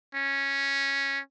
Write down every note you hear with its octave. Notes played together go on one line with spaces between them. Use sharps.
C#4